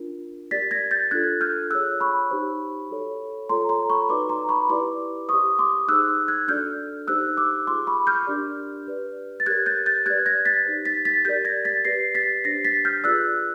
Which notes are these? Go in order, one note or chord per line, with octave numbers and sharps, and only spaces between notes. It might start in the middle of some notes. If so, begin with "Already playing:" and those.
Already playing: D4 F4 A#4
G4 A#4 D5 A6 B6
G#6 A#6
G6 A6
D4 F4 A4 F#6 G#6
F6 G6
F4 G#4 C#5 E6 F#6
B5 C#6
D#4 G4 C5
F#4 A4 C#5
F4 A4 C#5 A#5 C6
A#5 C6
B5 C#6
D#4 F#4 B4 D5 C6 D6
A#5 C6
B5 C#6
E4 G4 B4 D5 C6 D6
G4 C5 C#6 D#6
C6 D6
D#4 G#4 C5 E6 F#6
F#6 G#6
D4 F#4 A4 D5 F6 G6
D#4 G4 C5 E6 F#6
D6 E6
F4 G#4 C5 C6 D6
B5 C#6
F6 G6
D4 G4 A#4 D5
G4 B4 D5
A6
G4 A#4 C#5 F#6 G#6
G6 A6
G6 A6
G4 B4 D5 F#6 G#6
G#6 A#6
A6 B6
D#4 G4 C5
A6 B6
A6 B6
G4 A#4 D5 G6 A6
G#6 A#6
A6 B6
G4 B4 D5 A#6 C7
A6 B6
D4 G4 C5 A#6 C7
A6 B6
F6 G6
F4 G#4 B4 D5 E6 F#6